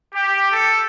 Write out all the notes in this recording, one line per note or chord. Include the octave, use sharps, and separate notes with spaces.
G4
A4